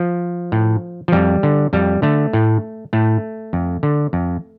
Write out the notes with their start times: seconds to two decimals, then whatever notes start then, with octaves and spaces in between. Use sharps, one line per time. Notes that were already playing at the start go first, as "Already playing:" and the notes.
Already playing: F3
0.52 A2
1.08 F3
1.12 F2 G3
1.43 D3
1.73 F2 G3
2.02 D3 A3
2.33 A2
2.93 A2 A3
3.53 F2
3.83 D3
4.13 F2